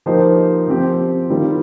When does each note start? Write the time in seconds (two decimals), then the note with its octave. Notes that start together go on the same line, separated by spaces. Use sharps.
0.06 F3 A#3 D#4 G4 C5
0.68 F3 C4 G4
1.29 D#3 G3 C4 F4 A#4